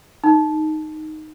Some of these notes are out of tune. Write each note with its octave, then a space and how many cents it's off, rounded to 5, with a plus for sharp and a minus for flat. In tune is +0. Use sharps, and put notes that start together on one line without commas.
D#4 -5